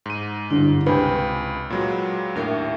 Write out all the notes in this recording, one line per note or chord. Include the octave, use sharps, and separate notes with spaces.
G#2 D#7
G2 D3 E4
C#2 C3 B4 G5 G#5 B5
A#2 F#3 G#3
D#2 A2 D4 A#4 E5